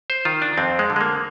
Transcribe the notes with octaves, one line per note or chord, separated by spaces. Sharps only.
C5
D#3 F4
D4
F2 C4
G#3
D3
G#3
A#3